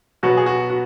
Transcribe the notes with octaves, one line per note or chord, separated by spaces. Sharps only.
B2 F#3 B3 F#4
G#4
F#4
F#4